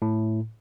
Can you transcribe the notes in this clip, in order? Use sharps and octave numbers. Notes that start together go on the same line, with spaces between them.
A2